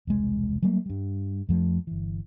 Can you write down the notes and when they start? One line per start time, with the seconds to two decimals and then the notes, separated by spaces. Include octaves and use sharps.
0.07 E1 C2 G#3
0.62 F#3 G3 A3 A#3
0.86 G2 G3
1.49 F2 F3 A3
1.87 G1 E3